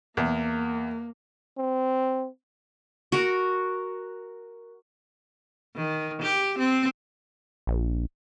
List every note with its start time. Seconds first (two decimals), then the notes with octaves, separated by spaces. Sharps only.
0.17 E2 A#3
1.58 C4
3.12 F#4 A#4
5.76 D#3
6.22 G4
6.59 C4
7.67 A#1